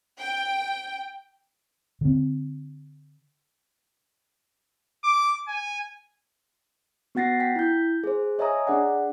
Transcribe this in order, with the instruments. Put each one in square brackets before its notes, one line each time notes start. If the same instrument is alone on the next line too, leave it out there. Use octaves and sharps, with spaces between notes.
[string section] G5
[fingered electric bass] D3 C4
[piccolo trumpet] D6
G#5
[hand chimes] B3 F#4 F#5 A6 A#6 C7
G5 B6
E4 G6
G#4 C5
C#5 D#5 E5 G#5 A#5 D#6
D4 G#4 D5 F#5